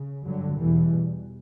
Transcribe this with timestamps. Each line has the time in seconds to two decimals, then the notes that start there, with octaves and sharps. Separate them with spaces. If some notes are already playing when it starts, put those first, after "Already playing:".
Already playing: C#3
0.25 G2 D3 F#3
0.59 E2 B2 E3 G3